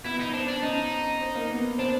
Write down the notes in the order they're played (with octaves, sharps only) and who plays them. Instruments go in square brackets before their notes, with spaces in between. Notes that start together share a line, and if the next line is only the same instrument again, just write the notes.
[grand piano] B3 [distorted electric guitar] E4
[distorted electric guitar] D#4
[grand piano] C4 [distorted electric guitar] D4
[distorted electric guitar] D4
[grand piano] C#4 [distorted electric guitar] D#4
[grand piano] C4
A#3
B3
[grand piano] C4 [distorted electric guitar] D4